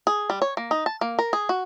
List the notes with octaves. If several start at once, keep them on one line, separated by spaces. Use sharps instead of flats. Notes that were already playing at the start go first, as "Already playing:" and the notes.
G#4
G3
C#5
A#3
D#4
A5
A#3
A#4
G#4
F#4